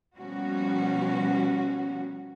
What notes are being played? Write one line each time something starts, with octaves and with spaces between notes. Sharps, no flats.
B2 F3 G3 A#3 C#4 F#4